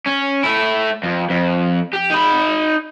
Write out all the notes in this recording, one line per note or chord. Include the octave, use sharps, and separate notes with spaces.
C#4
A3 E4
F2
F2
G4
D#4 B5